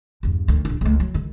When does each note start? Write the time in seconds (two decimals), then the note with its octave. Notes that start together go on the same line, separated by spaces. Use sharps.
0.23 E2 G2
0.48 D2 D#3
0.65 D1 D4
0.81 C#2 A3
1.00 F#3
1.14 C#2 D#3